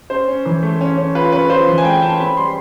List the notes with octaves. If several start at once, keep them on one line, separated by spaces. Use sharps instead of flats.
C#4 C5
C#4
E3
A3
C#4
C#4
F4 B4
C#4 B4
F4 C5
E3
G#5
A3 G5
C#4 A5
C4 B5
G3 C6